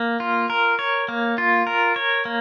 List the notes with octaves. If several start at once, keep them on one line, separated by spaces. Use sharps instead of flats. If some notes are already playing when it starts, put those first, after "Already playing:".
Already playing: A#3
F4
A#4
C#5
A#3
F4
A#4
C#5
A#3